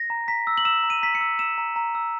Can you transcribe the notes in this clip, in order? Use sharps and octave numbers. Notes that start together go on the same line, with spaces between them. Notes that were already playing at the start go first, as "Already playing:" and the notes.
Already playing: A#6
A#5
A#5 B6
E6
F#7
E6 E7
A#5
D#7
A#5 B6
C#7
E6
E6 E7
A#5
A#5
E6